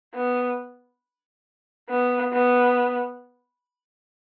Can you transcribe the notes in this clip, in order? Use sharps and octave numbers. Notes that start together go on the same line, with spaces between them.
B3
B3
B3